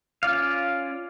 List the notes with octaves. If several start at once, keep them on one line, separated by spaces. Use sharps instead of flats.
C#4 F4 D5 F5